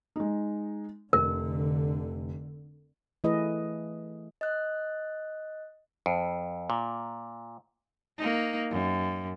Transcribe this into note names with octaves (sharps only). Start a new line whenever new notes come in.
G#3 D#4
F1 D3 A#4
E3 A3 E4 G#4 B4 D#5
D#5 F#6
F2
A#2
A#3 D#4
F#2